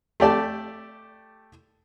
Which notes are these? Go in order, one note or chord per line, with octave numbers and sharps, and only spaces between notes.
A3 G4 D5 A5